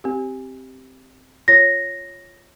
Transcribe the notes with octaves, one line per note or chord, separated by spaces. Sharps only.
C4 G4
F4 C#5 A#6